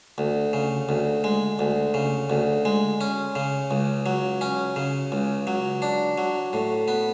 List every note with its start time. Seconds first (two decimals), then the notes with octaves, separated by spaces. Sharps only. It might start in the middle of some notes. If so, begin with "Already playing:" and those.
0.18 D2
0.53 C#3
0.89 D2
1.24 G#3
1.59 D2
1.94 C#3
2.30 D2
2.65 G#3
3.01 C#4
3.35 C#3
3.71 C#2
4.06 F#3
4.41 C#4
4.76 C#3
5.12 C#2
5.47 F#3
5.82 D4
6.18 F#3
6.53 A2
6.88 B3